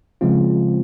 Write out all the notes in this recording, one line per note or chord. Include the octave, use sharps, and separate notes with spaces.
C#3 F3 G#3 C4 F4